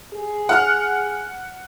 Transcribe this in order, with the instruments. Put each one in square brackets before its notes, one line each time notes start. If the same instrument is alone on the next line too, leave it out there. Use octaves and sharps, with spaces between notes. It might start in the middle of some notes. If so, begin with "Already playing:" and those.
[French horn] G#4
[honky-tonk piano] F#5 F6